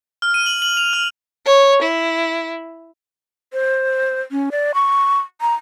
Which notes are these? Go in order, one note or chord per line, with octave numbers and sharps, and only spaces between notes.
F6
D#7
F#7
F#7
F7
F6
C#5
E4
C5
C#4
D5
C#6
A#5